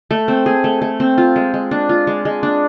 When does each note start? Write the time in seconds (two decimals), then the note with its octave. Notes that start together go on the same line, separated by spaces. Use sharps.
0.11 A3
0.28 C4
0.46 G#4
0.64 A3
0.82 A3
1.00 C4
1.18 F4
1.36 G#3
1.54 G#3
1.71 D4
1.89 F4
2.07 G#3
2.25 G#3
2.43 D4